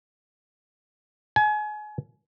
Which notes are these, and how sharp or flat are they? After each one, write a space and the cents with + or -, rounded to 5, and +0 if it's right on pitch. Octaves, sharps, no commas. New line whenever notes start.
G#5 +30